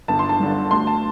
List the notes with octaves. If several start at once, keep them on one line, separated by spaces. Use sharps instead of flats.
G1 A5
C6
A5
G2 D3
D2 C6
A5